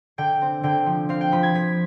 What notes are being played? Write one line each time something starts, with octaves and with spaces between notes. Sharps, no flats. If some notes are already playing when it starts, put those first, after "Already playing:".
D3 G5
C4
D3 G5
F3
C4 F5
G5
F3 B5
G#6
F3 B6